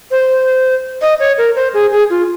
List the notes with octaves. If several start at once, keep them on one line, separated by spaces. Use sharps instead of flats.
C5
D#5
C#5
A#4
C5
G#4
G#4
F4